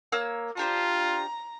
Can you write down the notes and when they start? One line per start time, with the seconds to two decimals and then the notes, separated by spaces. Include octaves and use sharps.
0.12 A#3 C#5 E6
0.57 D4 F4 G4 C5 A#5